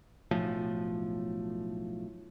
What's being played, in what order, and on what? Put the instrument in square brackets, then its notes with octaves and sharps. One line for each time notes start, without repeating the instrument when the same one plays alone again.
[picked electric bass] B1 A2 F3